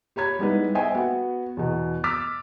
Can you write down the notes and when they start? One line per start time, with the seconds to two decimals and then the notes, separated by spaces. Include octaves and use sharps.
0.16 G4 C#5 B5 G#6
0.39 G3 G#3 B3 D#4 E4 B4
0.75 C5 D#5 E5 G5 G#5
0.95 B3 F#4
1.57 E2 B2
2.04 D6 E6 F6 A6 B6